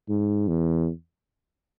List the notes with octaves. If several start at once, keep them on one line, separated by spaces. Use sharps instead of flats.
G#2
E2